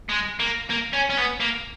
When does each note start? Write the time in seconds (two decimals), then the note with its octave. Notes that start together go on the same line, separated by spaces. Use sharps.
0.09 G#3
0.40 A#3
0.70 A#3
0.93 C#4
1.10 C#4
1.18 B3
1.40 A#3